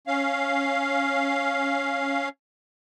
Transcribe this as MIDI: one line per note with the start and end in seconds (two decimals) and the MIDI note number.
0.07 2.29 61
0.07 2.29 77